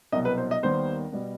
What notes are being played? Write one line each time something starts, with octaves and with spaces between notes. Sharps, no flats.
C2 B2 F#3 D#5
B4
C5
D#5
D#2 D#3 G3 B3 C5
B2 G3 B3